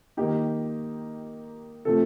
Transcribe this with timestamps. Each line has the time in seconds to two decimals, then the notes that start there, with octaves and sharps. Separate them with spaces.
0.17 D#3 A#3 D#4 G4
1.85 C3 F3 A3 A4